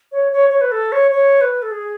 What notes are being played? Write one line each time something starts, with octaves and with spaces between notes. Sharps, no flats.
C#5
C#5
C#5
B4
A4
C#5
C#5
B4
A4
G#4